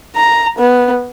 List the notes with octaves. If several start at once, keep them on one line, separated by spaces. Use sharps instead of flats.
A#5
B3